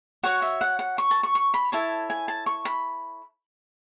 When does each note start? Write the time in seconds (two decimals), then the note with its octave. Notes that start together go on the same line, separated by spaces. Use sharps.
0.23 F#4 C#5 F#5
0.42 E5
0.61 F#5
0.79 F#5
0.98 C#6
1.11 A5
1.23 C#6
1.35 C#6
1.54 B5
1.72 E4 A4 C#5 A5
2.10 G#5
2.28 A5
2.46 C#6
2.65 B5